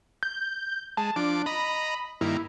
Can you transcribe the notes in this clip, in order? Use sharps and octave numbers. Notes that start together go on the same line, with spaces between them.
G6
G#3 A5
F3 D4 D5
D#5 A#5 B5
G2 D#3 A#3 E4